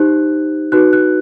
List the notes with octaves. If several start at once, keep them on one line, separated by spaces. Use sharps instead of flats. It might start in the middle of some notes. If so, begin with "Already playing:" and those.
Already playing: D#4 G4 C5 F#6
D#4 F#4 B4 F#6
F#6